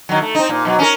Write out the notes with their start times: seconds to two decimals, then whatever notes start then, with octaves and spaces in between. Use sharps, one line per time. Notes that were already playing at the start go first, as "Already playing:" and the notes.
0.09 D#3 F#3
0.22 A3
0.35 C4 D#4
0.49 A#2
0.65 B2 F#3
0.79 C#4 D4 A#4